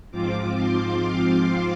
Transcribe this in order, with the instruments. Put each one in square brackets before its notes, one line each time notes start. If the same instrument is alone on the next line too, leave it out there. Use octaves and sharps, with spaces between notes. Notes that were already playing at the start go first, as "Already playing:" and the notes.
[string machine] G#2 F3 C4 F4 D6
C6
F5